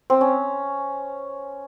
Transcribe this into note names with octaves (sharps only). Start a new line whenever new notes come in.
C4
C#4